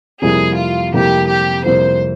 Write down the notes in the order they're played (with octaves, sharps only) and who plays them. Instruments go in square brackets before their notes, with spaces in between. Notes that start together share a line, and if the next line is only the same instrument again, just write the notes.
[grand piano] F2 C3 G3 A#3 E4 [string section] G#4
[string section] F4
[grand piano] F2 C3 G3 A#3 E4 [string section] G4
[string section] G4
[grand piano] F2 C3 G3 A#3 E4 [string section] C5